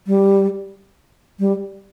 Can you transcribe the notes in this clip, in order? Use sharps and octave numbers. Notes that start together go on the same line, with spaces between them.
G3
G3